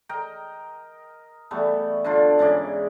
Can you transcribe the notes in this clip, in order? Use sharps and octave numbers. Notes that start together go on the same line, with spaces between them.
A#4 D#5 G5
E3 G3 A3 B3
D3 D4 F4
G#2 C#3 E3 D5